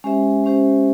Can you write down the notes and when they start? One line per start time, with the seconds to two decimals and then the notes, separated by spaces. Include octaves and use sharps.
0.04 G#3 C#4 G4 C5 E5
0.44 G#3 C#4 G4 C5 E5